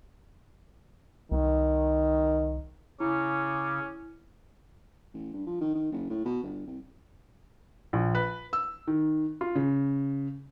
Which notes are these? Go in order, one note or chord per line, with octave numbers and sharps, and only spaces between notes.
C2 D#3
C#3 C#4 E4 D6
A1
G2
F3
D#3
D#3
F#1
A2
B2
G1
C2
A#1
B4
E6
D#3
F4
C#3